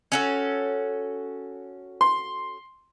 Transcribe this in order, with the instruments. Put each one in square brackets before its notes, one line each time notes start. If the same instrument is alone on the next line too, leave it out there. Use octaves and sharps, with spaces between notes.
[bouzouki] C#4 F#4 A4
[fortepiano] C6